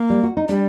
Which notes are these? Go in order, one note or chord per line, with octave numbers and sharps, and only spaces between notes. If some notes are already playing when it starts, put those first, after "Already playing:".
Already playing: A#3
G3
F#4
D#4
G3 D4